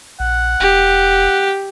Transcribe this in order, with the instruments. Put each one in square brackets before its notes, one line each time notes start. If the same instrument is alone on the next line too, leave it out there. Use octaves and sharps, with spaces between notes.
[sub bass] A#1 [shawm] F#5
[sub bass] E1 [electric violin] G4